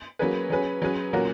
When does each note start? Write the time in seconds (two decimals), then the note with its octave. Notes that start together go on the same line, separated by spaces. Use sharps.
0.19 F#3 A#3 C#4 G#4 B4
0.50 F#3 C#4 G#4 B4
0.82 F#3 C#4 G#4 B4
1.13 A#2 F#3 C#4 F#4 A#4